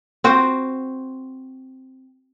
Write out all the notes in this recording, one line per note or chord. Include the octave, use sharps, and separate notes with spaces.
C4 F#4 C5